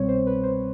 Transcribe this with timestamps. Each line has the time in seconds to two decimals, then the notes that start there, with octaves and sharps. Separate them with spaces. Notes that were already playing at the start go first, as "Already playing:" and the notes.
Already playing: C2 B2 G3 C4 C#5
0.08 C5
0.27 B4
0.44 C5